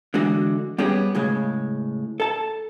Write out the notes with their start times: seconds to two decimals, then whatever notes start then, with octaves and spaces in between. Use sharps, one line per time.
0.14 D3 E3 G#3 F#4
0.78 G3 B3 C#4 G4 G#4
1.15 A2 C#3 G#3
2.20 A4 A5